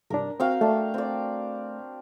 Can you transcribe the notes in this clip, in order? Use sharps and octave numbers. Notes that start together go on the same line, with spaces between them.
C2 G2 D4 A#4
C4 F#4 F5 G5
A3 D4
C4 D5